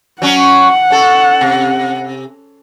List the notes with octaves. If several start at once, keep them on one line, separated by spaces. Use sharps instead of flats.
F#3 C#4 F#5
C#4 A4
C3